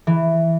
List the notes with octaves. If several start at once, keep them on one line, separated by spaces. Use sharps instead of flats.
E3